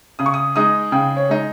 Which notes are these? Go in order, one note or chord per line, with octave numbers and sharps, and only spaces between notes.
C#3 D#6
C#6
D#6
G#3 D#4 D#6
C#3 G5
C#5
G#3 D#4